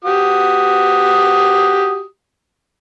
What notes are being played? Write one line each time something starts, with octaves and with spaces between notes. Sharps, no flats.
F#4 G4 D#6